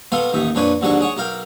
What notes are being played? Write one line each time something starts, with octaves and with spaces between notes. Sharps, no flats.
B2 B3 A4 B4 F5 C6
A1 D#2 D#4 E5
F2 A#2 D4 B4 C#5 G#5
D#2 G#2 D3 F#3 D4 C#6
G#4 C#5 F#5
B1 A#4 F5 G5